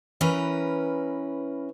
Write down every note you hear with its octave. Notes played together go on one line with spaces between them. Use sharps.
E3 C#4 A#4 B4